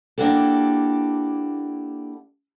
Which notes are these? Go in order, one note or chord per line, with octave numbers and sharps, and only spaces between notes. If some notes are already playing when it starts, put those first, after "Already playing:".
A#3 D4 E4 F#4 G4 A4